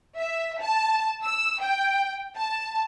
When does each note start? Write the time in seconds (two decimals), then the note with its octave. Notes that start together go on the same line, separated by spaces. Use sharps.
0.18 E5
0.61 A5
1.24 E6
1.62 G5
2.37 A5